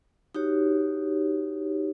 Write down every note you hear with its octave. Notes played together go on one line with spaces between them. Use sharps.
D#4 F#4 G4 C#5